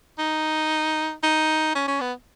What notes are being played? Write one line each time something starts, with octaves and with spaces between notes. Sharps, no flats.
D#4
D#4
C#4
C#4
B3